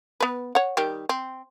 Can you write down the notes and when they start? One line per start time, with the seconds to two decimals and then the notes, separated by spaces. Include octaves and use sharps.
0.20 B3 B4
0.55 C#5 F#5
0.77 D#3 G3 G4
1.09 C4